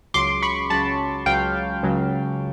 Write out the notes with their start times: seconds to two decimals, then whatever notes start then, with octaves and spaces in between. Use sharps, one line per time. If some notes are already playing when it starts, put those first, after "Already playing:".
0.14 C#2 C#3 F#3 C6 D6
0.43 B5 C#6
0.70 C#2 C#3 F#3 A5 B5
1.26 C#2 C#3 F#3 F5 G5
1.83 C#2 C#3 F#3